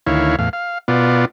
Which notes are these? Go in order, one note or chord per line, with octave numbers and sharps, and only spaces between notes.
D2 D#3 E4 C#5 F5
E2 A2 F5
F5
B2 B3 F4 D5